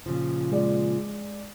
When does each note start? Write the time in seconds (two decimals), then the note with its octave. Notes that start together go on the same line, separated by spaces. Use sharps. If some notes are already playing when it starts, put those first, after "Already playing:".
0.06 A#2 C#3 F3
0.52 G#3 D5